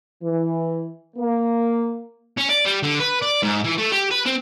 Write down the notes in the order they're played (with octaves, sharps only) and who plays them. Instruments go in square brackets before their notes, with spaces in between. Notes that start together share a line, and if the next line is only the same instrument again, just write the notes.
[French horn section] E3
A#3
[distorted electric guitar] C#4
D5
G3
D3
B4
D5
G#2
E3
A3
G4
B4
C4